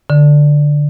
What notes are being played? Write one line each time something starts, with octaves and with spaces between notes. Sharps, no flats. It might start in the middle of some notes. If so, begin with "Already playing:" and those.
D3